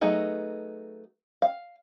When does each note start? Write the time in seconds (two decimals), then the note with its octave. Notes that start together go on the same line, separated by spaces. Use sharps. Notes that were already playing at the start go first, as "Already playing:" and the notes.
0.01 F#3 A3 B3 D#4 G#4
1.42 F5